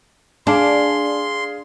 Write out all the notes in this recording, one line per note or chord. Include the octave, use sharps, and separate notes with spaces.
D4 G#4 F5 C6